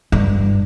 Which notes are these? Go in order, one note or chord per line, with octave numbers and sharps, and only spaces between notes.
G2